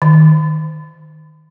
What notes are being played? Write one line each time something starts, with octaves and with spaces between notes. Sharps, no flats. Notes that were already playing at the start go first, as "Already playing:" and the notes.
D#3